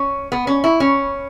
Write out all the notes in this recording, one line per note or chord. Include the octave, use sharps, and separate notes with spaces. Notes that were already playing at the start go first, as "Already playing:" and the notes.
Already playing: C#4
B3
C#4
E4
C#4